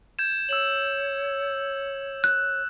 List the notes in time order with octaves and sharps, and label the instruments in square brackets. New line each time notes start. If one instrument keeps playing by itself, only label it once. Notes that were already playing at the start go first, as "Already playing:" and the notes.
[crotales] G6 G#6 E7
[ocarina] C#5 [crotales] E6 E7 F#7
[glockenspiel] F#6